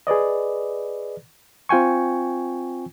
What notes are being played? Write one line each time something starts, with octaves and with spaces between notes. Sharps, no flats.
G#4 B4 D5 D#5
C4 F4 G5 G#5 C#6